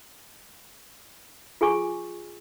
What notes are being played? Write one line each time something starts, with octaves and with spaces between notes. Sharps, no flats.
F4 G#4 G#5 C#6 D6